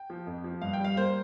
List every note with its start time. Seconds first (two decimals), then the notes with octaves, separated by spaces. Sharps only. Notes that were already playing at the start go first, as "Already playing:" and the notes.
Already playing: G5
0.10 F3
0.27 F2
0.44 F3
0.61 G2 F5
0.73 G5
0.80 G3 F5
0.97 A#3 C5